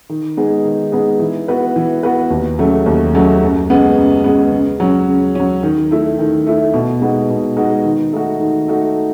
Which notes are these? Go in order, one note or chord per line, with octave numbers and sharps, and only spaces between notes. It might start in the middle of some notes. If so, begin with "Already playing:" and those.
D#3
G#3 B3 D#4 G#4
D#3
G#3 B3 D#4 G#4
E3
B3 F#4 B4
E3
B3 F#4 B4
D#2
C#3 F#3 A3
D#2
C#3 F#3 A3
F#2
C#3 G#3 B3
F#2
C#3 G#3 B3
C#3
F#3 C#4
C#3
F#3 C#4
D#3
A3 E4
D#3
A3 E4
B2
G#3 B3 D#4 F#4
B2
G#3 B3 D#4 F#4
D#3
A3 D#4 F#4
D#3
A3 D#4 F#4